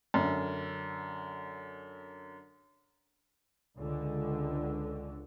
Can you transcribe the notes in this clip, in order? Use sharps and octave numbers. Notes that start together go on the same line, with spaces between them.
F#2 D3
C#2 D3